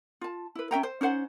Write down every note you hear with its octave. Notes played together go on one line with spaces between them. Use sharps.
F4 A5
E4 B4
C#4 E5 G5 A#5
C5
C#4 D#4 C5 F#5